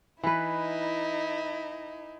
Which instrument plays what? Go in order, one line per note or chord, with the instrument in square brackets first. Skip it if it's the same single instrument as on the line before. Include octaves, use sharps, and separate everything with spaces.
[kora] E3 B4 [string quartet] D#4 E4